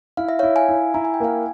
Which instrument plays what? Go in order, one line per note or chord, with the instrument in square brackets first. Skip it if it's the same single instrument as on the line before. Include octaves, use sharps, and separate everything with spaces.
[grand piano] E4 [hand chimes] F5
[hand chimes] E5
[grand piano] E4 [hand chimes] C#5 F5
[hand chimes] F5 G#5
[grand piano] E4
[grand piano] E4 [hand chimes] A#5
[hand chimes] G#5
G5
[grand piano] A#3 [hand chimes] F5 G#5